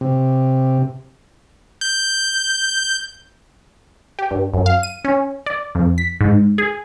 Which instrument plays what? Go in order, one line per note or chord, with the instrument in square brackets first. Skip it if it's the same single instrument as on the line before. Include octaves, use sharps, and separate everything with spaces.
[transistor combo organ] C3
[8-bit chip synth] G6
[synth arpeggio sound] G4
G2
F#2
F5
D#7
C#4
D5
F2
B6
G#2
G#4